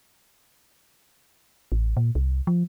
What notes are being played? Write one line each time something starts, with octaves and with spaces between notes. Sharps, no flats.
A1
A#2
C2
F3